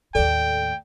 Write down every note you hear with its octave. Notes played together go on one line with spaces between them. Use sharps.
D#2 A2 A4 D5 G5